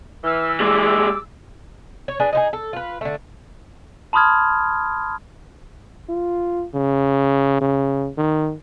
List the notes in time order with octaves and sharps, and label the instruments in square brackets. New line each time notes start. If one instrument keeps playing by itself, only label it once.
[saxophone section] E3 [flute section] E6 F6
[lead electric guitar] G3 G#3 [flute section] D6 E6
[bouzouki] C#5
D4 G#4 B4
D#4 E4 G#4
A4
F4 B4
D3 A3
[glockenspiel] A5 B5 C6 D#6 F6 G#6
[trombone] F4
C#3
C#3
D#3